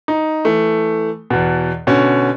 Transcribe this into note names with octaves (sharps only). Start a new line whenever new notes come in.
D#4
E3 A3
E2 B2
B2 D3 C#4